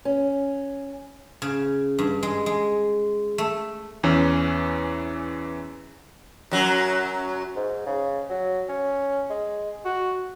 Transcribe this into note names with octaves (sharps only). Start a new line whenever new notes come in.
C#4
C#3
G2
G#3
G#3
A3
E2 E3 C#4
F#2 F#3
G#2
C#3
F#3
C#4
G#3
F#4